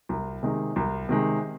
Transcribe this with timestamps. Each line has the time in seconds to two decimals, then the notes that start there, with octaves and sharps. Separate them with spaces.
0.09 C2
0.43 C3 D#3 G#3
0.76 C2
1.09 C3 D#3 G#3